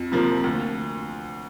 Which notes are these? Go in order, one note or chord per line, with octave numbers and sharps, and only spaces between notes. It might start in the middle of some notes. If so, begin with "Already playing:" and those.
Already playing: F2
C3 F3 A#3
D2